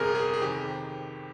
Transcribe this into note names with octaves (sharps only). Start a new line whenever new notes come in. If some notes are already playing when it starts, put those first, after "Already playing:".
Already playing: G1 F2 C3 G#4 A#4
G#4
G#4
F2 C3 D#3 G4